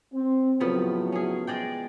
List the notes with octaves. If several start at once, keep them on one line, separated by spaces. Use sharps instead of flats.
C4
A2 C#3 F3 F#3 B3
C#4 G#4
G#3 D5 G5